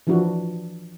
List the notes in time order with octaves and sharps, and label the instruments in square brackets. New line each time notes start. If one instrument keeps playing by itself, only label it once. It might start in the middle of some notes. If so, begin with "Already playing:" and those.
[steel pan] E3 F3 D4 E4 F#4